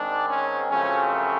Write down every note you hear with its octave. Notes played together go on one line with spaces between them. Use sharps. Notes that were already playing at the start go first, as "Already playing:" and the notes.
Already playing: G#2 D#3 G#3 C4 D4
C#4
F#2 C#3 F3 A3 C4 C#4